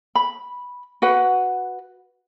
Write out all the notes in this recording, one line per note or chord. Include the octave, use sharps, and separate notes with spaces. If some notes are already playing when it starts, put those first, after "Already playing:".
B5
F#4 B4 F#5